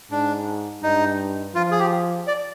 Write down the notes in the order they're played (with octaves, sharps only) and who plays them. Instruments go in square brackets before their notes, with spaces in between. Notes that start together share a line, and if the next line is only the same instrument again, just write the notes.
[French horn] G#2 [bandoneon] D4
[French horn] G2 [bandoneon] D#4
[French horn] F3 [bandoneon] F4
[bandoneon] G#4
G4
D5